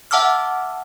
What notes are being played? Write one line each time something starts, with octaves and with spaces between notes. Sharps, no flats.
E5 F#5 A5 D6 E6 F6